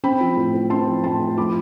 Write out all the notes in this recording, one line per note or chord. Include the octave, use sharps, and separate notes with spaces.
C4 G5 B5
F3
A2
A2
C4 A5 C6
F3
A2 A5 C6
A2
F3 B5 D6